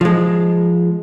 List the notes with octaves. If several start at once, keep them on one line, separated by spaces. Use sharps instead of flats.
F3 G#3